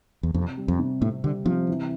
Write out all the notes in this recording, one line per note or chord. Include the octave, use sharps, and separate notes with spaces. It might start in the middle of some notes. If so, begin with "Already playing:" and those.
E2
F2 C3
G3
F2
C3
A2 C3
D3 G3
C3 F3
E3